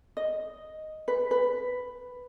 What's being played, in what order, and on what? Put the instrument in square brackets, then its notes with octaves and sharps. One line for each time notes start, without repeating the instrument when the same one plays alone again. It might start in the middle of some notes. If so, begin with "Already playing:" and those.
[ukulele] D#5
B4
B4